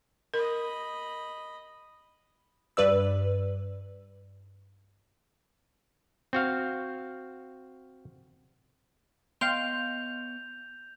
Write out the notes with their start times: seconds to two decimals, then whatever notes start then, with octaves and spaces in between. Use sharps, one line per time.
0.34 A#4 D#5 B5
2.77 G2 B4 D5 E6
6.33 C4 F#4 F5
9.41 B3 C#5 D#5 F5 G5 C6 G6 F7